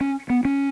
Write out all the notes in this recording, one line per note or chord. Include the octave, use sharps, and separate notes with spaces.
C#4
B3
C#4